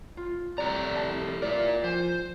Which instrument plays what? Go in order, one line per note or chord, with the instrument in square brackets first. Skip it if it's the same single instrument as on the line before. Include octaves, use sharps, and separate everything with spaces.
[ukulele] F4
[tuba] C2 [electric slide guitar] A3 G4 A#5 [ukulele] D5
[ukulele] A5
[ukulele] E4 D5 [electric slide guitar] F4 A#4
[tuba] F3 [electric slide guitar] C5 [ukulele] G#5